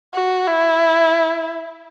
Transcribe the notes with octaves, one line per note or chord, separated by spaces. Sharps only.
F#4
E4